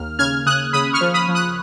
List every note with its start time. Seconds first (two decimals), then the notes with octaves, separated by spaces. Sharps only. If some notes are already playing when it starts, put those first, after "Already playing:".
Already playing: D#2 A#3 F6
0.19 C#3 F6 G#6
0.46 C#3 D#6 F#6
0.73 C#3 B5 D#6
0.93 C#6 F6
1.01 F3
1.14 B5 D#6
1.28 F3
1.35 D#6 F#6